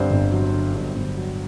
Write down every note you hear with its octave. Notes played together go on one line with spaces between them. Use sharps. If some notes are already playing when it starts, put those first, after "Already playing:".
Already playing: G2 D3 C4 C5
G1
F#3
D3
G2
G1
F#3